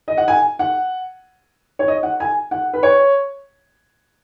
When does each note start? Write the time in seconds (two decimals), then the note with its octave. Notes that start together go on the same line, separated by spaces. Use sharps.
0.08 D#5
0.17 F#5
0.28 G#5
0.59 F#5
1.79 C#5
1.88 D#5
2.03 F#5
2.20 G#5
2.51 F#5
2.73 B4
2.83 C#5